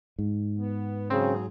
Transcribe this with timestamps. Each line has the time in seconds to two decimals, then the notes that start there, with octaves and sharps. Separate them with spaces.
0.19 G#2
0.58 B3
1.10 C#3 F#3 C4 G#4